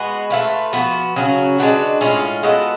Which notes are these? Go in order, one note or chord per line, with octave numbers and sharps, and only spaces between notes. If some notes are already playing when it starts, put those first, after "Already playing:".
Already playing: G#3 B3 F#4
A3 F4 B4
F3 B3 F#4
C#3 F#3 C#4 F#4
G#3 D4 F#4 B4
A2 G#3 C#4 F4
G#3 B3 F#4 A4